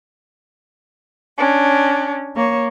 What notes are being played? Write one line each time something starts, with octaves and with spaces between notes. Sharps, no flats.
C#4 D4
A#3 C#5